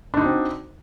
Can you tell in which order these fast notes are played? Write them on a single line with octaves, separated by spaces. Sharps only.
D4 D#4 F#4 C4